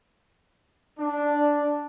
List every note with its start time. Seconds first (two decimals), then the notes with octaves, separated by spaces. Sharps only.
0.99 D4